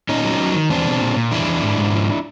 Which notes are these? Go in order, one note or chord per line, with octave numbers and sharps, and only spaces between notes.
A#2 C#4 D#4
F#3
F#3
D#3
E2 C4 D4
B2
A#2
A#2
E2 D4 E4
E2
G#2
G#2
F3